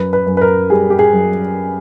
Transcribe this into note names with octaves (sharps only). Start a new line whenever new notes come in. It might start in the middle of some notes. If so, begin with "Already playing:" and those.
Already playing: F#2 B4
B4
F#2
B4
A#4
G3 G#4
G4
G#4
F#2